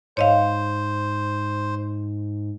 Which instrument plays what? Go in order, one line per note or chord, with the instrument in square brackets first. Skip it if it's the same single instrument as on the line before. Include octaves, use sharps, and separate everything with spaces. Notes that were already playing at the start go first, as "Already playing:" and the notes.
[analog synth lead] G#2 [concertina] C5 [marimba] C#5 D#5 F5